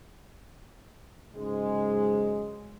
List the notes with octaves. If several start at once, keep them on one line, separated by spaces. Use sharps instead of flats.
G#2 C#3 F#3 G#3